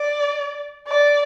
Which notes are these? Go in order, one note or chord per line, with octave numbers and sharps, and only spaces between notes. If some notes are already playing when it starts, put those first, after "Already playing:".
Already playing: D5
D5